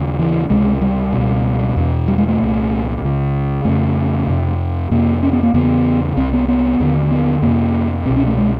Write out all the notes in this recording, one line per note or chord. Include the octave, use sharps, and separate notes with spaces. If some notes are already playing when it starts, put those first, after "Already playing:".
Already playing: D#2 C#3
E3
C#2 C3 G#3
G3
C#2 B2
E2 B2
G3
G#3
A3
C2 A#2
C#2 C#3
F2 C#3 A3
F2 C3
F2 C3 A#3
C#4
B3
A#3
E2 C#3 B3
C2 C3 C4
B3
B3
D#2 D3
B3
F2 C3 A#3
C2 B2 C4
C#4
A3
G#3